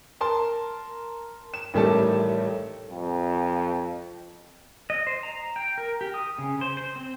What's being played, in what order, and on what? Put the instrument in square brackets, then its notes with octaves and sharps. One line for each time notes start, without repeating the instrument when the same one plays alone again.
[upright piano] A#4 A5 C6
E7
A1 D#3 G3 A3 A5
[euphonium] F2
[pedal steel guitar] D#5
C5
A#5
G5
A#4
G4
D#6
C#3
C5
C5
C4